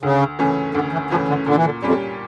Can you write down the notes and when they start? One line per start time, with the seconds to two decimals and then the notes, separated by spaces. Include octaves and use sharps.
0.03 D2 C#3
0.39 C#3 E3 A3 C#4
0.75 D2 D3
0.92 E3
1.10 C#3 E3 F3 A3 C#4
1.28 D3
1.46 A#2 D3
1.56 E3
1.65 D3
1.82 F2 G3 C#4 G4